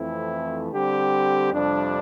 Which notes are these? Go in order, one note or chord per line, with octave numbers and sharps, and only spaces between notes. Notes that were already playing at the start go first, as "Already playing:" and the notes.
Already playing: F2 E3 A3 C4 E4
D3 G3 C4 G4
F2 C3 G3 D4